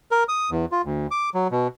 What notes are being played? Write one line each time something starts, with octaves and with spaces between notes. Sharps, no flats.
A#4
D#6
E2
F4
D2
D6
F#3
B2